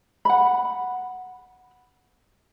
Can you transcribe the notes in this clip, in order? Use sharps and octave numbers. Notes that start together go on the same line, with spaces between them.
F#5 B5